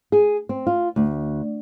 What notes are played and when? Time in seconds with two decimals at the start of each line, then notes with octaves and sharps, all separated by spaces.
0.12 G#4
0.49 C4
0.67 F4
0.96 D2